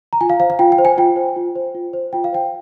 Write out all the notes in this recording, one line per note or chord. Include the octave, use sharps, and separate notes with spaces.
A#5
F4 G#5
F5
C5 F5
F5
F4 G5
G5
C5
G#5
F4 G5
C5
F4
C5
F4
C5
F4 G5
F5
C5 G5